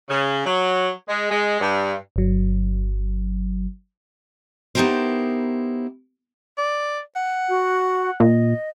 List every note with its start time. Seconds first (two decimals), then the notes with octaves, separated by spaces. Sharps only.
0.08 C#3
0.45 F#3
1.07 G#3
1.30 G#3
1.60 G2
2.16 G1 F#3
4.75 B3 D#4 E4 G4 A#4 C5
6.58 D5
7.16 F#5
7.49 F#4
8.20 A#2 D#5